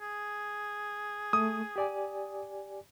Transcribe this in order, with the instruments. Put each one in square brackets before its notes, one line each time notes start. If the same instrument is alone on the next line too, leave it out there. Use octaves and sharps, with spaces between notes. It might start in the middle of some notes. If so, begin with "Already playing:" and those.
[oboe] G#4
[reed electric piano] A3 [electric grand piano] D#6
[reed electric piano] G4 D5 G#5